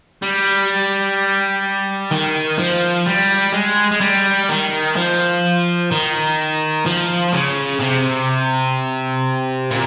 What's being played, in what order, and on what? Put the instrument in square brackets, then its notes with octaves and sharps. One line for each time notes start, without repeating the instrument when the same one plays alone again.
[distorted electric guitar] G3
D#3
F3
G3
G#3
G#3
G3
D#3
F3
D#3
F3
C#3
C3
A#2